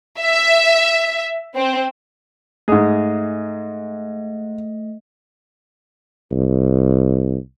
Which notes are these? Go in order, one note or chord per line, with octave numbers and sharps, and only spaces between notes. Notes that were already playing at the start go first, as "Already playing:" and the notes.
E5
C4
G#2 A3 G#4 D#5
C2